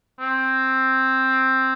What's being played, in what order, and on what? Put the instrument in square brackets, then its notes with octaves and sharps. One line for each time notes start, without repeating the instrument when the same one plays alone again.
[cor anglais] C4